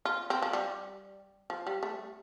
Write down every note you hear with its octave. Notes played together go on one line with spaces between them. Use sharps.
F4
C4
F3
G3
F3
G3
A3